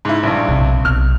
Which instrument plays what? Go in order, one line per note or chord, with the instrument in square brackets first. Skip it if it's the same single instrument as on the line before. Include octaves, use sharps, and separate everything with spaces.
[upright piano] G#2 E4
A#1 G2
[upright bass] B1 C3
[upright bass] B1 [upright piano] F6